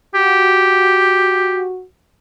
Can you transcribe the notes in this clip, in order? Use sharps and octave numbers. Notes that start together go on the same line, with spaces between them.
F#4 G4